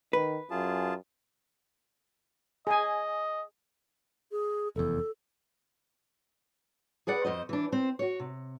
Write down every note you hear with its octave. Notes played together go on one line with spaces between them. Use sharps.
D#3 B4
F#2 F4 G#4 A5
G#4 D#5 G#5
G#4
F1 E2 A4
G#4 B4 D5 F#5
F2 C5 D#5
E3 D4
C4 C5
F#4 C#5
C3